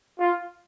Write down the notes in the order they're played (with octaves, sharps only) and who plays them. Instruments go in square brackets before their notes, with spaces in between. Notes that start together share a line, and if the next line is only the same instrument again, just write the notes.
[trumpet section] F4